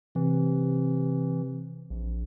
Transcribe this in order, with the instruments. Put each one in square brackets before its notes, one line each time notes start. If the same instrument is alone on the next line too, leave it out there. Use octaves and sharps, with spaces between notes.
[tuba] C3 [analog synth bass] E3
[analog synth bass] A#1